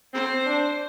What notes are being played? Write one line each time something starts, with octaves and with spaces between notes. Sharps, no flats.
C4 C5
D4